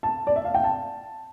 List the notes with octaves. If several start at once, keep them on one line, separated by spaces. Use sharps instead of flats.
A5
D5
E5
F5
G5
A5